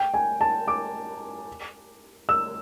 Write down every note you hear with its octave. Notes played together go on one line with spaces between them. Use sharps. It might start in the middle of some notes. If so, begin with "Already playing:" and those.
Already playing: G5
G#5
A5
D6
E6